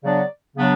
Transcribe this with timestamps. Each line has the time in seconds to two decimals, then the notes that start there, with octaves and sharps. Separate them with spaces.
0.03 C#3 F#3 B3 D4 D5
0.56 C#3 F#3 B3 D4